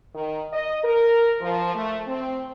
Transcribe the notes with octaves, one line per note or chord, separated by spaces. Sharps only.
D#3
D#5
A#4
F3
A3
C4